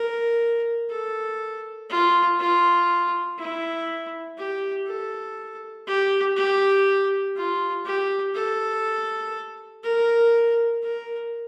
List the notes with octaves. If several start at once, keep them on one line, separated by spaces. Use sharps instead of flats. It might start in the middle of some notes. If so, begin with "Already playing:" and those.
Already playing: A#4
A4
F4
F4
E4
G4
A4
G4
G4
F4
G4
A4
A#4
A#4